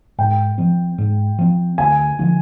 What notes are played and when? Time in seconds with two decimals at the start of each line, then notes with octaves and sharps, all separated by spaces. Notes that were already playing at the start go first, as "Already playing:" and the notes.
0.18 G#2 G5
0.58 F3 C4
0.98 G#2
1.39 F3 C4
1.78 D2 G#5
2.19 D3 F3